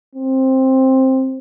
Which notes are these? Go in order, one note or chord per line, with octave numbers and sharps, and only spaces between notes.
C4